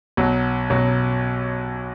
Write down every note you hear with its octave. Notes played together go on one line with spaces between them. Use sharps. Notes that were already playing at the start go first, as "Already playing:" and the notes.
B1 B2 F#3
B1 B2 F#3